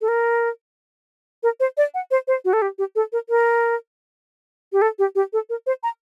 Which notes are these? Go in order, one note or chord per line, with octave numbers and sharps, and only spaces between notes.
A4
A#4
A#4
C5
D5
F#5
C5
C5
F#4
A4
G4
G4
A4
A#4
A#4
G4
A4
G4
G4
A4
A#4
C5
A#5